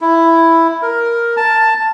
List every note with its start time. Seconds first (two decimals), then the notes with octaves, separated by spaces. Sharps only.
0.01 E4
0.82 A#4
1.37 A5